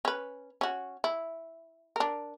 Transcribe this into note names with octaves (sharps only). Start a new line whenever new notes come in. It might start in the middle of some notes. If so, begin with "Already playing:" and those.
C#4 B4
C#4 F#4
E4
D4 A#4